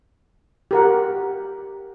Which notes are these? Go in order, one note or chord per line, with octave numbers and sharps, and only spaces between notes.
G4 A#4 F#5